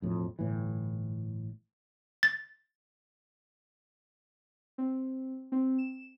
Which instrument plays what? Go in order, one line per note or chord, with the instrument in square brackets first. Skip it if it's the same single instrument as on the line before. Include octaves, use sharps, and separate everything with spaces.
[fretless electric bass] E1 F2 A2
G1 A2 E3
[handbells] A6
[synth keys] C4
C4
E7